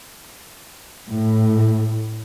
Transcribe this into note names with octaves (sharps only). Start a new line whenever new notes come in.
A2